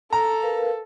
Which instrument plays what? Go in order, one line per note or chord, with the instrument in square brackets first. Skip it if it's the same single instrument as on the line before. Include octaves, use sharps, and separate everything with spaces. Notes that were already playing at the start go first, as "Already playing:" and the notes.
[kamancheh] A4 [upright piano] A#5
[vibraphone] A#4 B4 F5